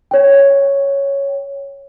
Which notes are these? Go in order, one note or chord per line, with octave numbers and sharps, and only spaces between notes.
C#5 G5